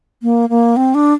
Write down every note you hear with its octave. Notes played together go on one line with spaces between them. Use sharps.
A#3
A#3
C4
D4